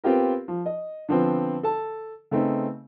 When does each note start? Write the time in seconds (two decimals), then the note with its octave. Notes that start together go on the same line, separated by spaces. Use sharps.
0.04 B3 C4 F4 G4 A#4
0.48 F3
0.66 D#5
1.09 D3 F3 B3 C4
1.63 A4 A5
2.31 C#3 A3 B3 C4 D#4